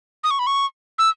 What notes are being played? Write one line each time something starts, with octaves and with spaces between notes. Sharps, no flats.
D#6
C#6
B5
C#6
E6